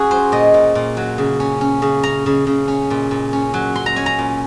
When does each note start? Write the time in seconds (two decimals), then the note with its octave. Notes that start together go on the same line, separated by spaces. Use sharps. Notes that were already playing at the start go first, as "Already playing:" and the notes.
Already playing: C#4 F#4 G#4
0.11 F#3 C5
0.32 A#2 D#5
0.54 A#2
0.75 A#2
0.97 F#3
1.18 C#3
1.40 C#4
1.61 C#4
1.82 C#3
2.03 C#4 A#5
2.26 C#3
2.47 C#3
2.68 C#4
2.90 A#2
3.11 A#2
3.33 C#4
3.54 F#3
3.75 C#4 C6
3.86 A#5
3.96 C#4 G#5
4.06 A#5
4.19 A#2